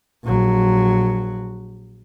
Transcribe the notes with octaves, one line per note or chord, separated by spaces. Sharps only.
A#1 F#3